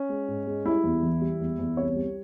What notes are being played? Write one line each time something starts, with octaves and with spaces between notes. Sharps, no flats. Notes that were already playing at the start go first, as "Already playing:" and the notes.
Already playing: C#4
G#3
G#2
G#3
G3 E4
E2
E3
G3
E2
E2
C2 C#5
G3